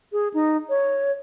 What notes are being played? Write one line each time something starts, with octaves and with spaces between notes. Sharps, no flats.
G#4
D#4
C#5